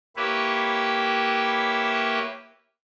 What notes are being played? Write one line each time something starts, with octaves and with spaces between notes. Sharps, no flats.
A#3 E4 G4 B4 C#5 E5